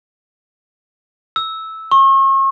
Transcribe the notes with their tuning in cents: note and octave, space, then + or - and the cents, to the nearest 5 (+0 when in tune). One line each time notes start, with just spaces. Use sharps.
E6 -10
C#6 -40